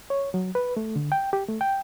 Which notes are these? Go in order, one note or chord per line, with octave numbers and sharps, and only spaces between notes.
C#5
F#3
B4
A3
D3
G5
G4
A3
G5